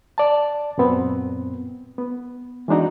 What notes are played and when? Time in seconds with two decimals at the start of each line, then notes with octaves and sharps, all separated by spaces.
0.18 D5 A5
0.78 F#2 A#2 B3 C4
1.98 B3
2.68 E3 G#3 D4 D#4 F#4